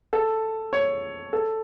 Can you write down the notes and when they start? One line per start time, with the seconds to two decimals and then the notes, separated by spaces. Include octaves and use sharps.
0.13 A4
0.73 C#5
1.33 A4